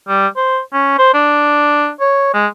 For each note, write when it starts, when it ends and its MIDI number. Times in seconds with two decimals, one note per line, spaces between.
0.08 0.27 55
0.36 0.59 72
0.73 0.97 61
0.98 1.11 72
1.14 1.90 62
2.00 2.31 73
2.33 2.47 56